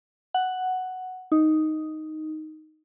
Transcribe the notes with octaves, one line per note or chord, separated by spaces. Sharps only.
F#5
D#4